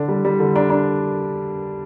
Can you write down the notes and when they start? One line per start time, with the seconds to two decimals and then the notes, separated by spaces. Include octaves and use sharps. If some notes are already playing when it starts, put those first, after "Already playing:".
Already playing: D3 D4
0.09 G3
0.25 G3
0.39 D3
0.56 D4
0.70 D4